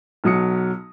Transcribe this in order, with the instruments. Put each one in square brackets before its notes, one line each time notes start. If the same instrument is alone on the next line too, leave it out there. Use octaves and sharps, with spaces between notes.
[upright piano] B1 F#3 D#6 C#7